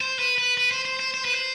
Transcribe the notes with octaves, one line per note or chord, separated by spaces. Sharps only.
C5
B4
B4
B4
C5
C5
C5
C5
B4
C5